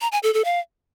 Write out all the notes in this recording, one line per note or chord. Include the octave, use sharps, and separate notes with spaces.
A#5
G#5
A4
A4
F5